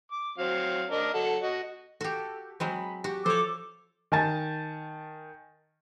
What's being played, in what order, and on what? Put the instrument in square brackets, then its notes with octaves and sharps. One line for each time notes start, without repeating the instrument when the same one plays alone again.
[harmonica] D6
F#3 C4 F5
D4 A#4 D#5
F#3 A4 F#5
F#4 D#5
[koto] F#4 G4 [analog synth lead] A4
[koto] F#3 G#3 C4 [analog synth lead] B5
[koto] F#4 [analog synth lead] G4
[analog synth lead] F3 [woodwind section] A4 D6 [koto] C5 C#5
[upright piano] D#3 G#5 A5 A6